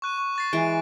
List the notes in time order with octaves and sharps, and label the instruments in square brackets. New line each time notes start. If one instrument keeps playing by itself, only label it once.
[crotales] C#6 F#6 D#7
C#6
C#6 A6 C7
[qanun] E3 G#3 [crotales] C7 D7